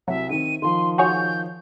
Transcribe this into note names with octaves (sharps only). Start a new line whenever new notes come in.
C2 F#3 E5
D#3 C4 D#7
D#3 F3 C6
F#4 G#4 C#5 G6